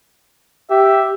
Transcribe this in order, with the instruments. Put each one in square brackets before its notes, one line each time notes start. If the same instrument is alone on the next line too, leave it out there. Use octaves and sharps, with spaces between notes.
[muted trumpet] G4 [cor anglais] E5